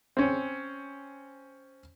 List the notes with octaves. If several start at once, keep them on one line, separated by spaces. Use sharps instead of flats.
C4 C#4